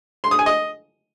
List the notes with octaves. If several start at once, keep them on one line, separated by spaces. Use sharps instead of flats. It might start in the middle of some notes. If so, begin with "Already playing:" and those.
C6
D#6
G#5
D#5